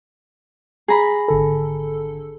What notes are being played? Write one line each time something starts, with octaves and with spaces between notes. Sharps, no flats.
G#4 A#5 B5
G#1 D3 A4